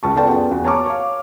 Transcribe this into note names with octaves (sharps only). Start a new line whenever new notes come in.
C#2 A5 C#6
B3 F4 A4 D5 G5 A5
F#2 B3 G#4 G5
E2 F#4
C#5 A5 A#5 C#6 D6
C#5 F5